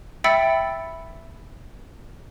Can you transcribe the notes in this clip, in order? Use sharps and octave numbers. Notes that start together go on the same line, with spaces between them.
E5 G5 B5 E6 A6 C#7